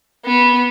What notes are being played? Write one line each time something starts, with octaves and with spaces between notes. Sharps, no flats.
B3